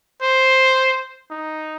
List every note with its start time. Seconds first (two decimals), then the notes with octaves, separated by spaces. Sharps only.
0.22 C5
1.31 D#4